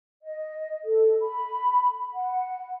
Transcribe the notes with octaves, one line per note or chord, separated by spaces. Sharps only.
D#5
A4
B5
F#5